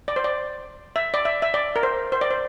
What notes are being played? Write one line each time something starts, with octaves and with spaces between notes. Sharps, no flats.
D5
C5
D5
E5
D5
E5
E5
D5
A#4
C5
C5
D5
C5